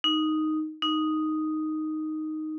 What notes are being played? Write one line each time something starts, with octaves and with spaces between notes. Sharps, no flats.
D#4
D#4